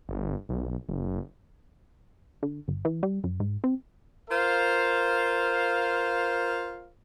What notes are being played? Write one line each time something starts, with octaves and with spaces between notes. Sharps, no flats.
G1
B1
F#1
D3
G1
E3
G3
F#2
G#2
C4
F4 A#4 C5 F5